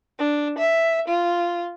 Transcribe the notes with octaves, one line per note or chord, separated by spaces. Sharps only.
D4
E5
F4